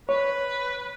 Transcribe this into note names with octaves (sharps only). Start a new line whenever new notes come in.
B4 C#5